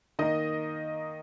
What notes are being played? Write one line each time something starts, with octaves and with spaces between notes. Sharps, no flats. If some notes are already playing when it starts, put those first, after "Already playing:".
D#3 A#3 D#5